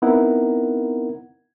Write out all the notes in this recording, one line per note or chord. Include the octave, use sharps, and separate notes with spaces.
B3 C4 D#4 E4 A#4 F#5